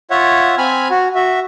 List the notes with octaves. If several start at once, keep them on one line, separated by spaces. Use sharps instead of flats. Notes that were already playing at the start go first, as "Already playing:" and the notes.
F4 C#5 E5 F#5
C4 G#5 B5 F6
F#4
F#4 E5